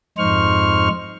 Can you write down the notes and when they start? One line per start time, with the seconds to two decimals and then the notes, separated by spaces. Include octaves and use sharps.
0.18 F2 G#2 D#4 C5 C#6 F6